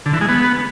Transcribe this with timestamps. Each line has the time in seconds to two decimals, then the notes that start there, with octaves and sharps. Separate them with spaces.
0.06 D3
0.13 E3
0.21 G#3
0.29 B3